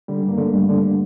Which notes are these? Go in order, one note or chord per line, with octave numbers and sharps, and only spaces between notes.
D3 G3
G2
A#3
D3 A3
G2
D3